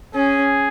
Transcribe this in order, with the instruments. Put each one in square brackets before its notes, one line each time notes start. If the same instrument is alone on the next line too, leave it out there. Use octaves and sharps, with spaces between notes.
[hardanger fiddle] C#4 [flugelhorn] G#4